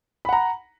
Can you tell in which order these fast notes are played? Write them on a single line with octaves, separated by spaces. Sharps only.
B5 F#5 A#5